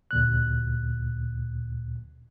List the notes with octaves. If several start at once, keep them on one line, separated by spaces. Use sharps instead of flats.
D2 A#2 F#6